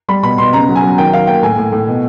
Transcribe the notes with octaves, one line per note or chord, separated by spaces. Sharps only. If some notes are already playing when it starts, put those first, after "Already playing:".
G3 B5
B2 B5
B2 C6
C#3 A#5
F#3
G#5
F#3
D#3 G5
D#3 F5
A#3 G5
A2 G#5
A2
A2
B2